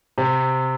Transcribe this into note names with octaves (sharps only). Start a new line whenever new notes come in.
C3